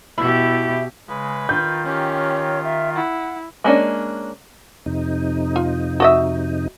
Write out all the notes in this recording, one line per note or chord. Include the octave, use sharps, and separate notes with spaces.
B2 E4 G4
C#3 G#3 B4
D#3 F4 G6
C#4 G4 C#5
E5
E4 F#5
G#3 A#3 C#4 D4
F2 C3 D#4
F4
F#4 D#5 E5